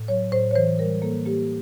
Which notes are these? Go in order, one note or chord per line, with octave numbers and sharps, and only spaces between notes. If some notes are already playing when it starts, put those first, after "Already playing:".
Already playing: A2
F#3 C#5
A2 C5
C#5
E3 C5
G3 A#4
A#3 A4
A#3 G4